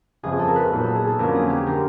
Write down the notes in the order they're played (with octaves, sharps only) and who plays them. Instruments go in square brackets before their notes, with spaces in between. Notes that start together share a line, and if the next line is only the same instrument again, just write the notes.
[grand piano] G1 F2 C#3 F3 [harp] G#4
[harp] A4
A#4
B4
[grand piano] A#2 F#3 B3 D#4
[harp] A4
G#4
A4
[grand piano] F2 D3 F#3 A#3 C#4 [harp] A#4
[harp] G#4
G4
[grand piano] D3 G3 [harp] A#4